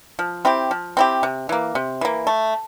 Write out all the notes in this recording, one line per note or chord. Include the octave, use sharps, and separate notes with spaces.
F3
C4 E4 G4
F3
C4 E4 G4
C3
E3 A#3
C3
E3 A#3
A3